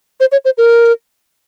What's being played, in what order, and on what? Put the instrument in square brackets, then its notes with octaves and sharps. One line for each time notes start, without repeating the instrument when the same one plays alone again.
[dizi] C5
C#5
C5
A#4